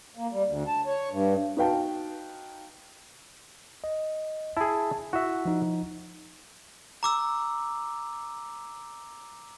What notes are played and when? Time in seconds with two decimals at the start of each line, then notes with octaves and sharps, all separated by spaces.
0.17 A#3
0.32 G3
0.47 D2
0.67 A5
0.86 C#5
1.11 G2
1.57 D#4 F#4 B4 F5 G5 A5
3.84 D#5
4.57 E4 G#4 A5
5.13 E4 F#4 E5
5.46 F3 D#4
7.03 A#5 D6 E6